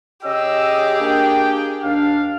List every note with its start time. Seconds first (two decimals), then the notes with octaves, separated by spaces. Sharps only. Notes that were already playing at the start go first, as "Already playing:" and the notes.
0.25 C#3 C#4 G4 G#4 D#5 E6
1.00 A#3 D4 G5
1.83 D#2 D4 F5